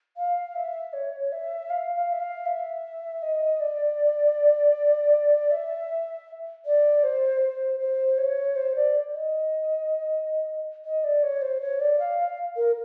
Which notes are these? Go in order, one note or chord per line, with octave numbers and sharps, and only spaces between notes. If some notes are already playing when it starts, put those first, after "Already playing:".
F5
E5
C#5
E5
F5
F5
E5
F5
E5
D#5
D5
E5
D5
C5
C5
C5
C#5
C5
D5
D#5
D#5
D5
C#5
C5
C#5
D5
F5
F5
A#4